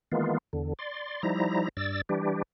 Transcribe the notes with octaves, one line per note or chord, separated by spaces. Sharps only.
D#3 E3 G#3 A#3 B3 F4
E2 D3
D5 C6
F3 G3 D#4 E4 A#5
G2 D5 E6 A6
E3 G3 D4 G4